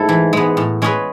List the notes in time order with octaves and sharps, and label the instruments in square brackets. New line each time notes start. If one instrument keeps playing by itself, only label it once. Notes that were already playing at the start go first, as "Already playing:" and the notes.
Already playing: [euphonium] G#2 [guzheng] A3 E4 A4
[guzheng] E3
G#3 B3
A2
G#3 C#4 G#4 B4